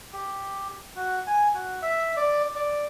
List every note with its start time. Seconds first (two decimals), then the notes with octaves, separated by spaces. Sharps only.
0.13 G4
0.96 F#4
1.27 G#5
1.55 F#4
1.82 E5
2.17 D5
2.56 D5